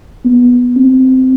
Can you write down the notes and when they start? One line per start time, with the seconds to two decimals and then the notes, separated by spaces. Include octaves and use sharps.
0.25 B3
0.77 C4